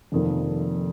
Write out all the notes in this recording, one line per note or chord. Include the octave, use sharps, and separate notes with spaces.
F1 F2 D#3 A#3